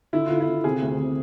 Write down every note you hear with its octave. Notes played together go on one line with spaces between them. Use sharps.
D3 E4
D3 F4
E4
D3
C3 G#4
D2
C3